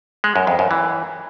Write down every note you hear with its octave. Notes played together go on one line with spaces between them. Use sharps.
G#3
F#2
F2
F#2
E3